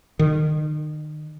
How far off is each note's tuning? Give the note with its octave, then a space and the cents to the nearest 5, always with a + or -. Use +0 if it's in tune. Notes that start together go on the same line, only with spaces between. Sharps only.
D#3 -35